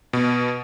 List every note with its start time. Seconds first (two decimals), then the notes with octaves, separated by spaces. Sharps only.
0.13 B2